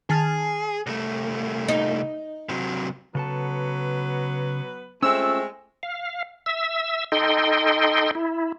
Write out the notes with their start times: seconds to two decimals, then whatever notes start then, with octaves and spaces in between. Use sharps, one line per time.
0.10 D#3 G#4 A5 F6
0.87 C2 A3
1.68 D#4
2.49 C3 F#3
3.15 C#3 F#3 B3 A4 B4 A5
5.02 G#3 A3 C4 C#4 F4 E6
5.83 F5
6.46 E5 E6
7.12 D#4 A4 D#5 G5 C6
8.15 E4